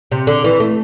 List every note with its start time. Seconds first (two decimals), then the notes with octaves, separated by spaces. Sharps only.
0.12 C3
0.27 D3
0.44 E3
0.60 A3